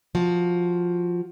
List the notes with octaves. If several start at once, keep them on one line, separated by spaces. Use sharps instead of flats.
F3 F#4